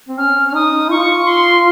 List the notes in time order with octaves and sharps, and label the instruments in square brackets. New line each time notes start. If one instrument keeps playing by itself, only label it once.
[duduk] C4
[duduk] C#4 [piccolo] F6
[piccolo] F6
[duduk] D#4 [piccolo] D#6
[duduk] F4 [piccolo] C#6
[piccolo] C6